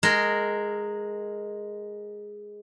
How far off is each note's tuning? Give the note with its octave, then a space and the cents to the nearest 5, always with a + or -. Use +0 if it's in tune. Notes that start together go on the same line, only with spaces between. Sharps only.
G#3 +0 A#4 -10